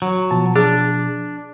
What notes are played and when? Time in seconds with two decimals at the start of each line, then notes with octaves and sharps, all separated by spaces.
0.02 F#3
0.31 B2 F3 A5
0.56 D4 G#4